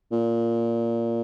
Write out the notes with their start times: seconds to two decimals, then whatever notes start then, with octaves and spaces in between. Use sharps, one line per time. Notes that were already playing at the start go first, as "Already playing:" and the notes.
0.12 A#2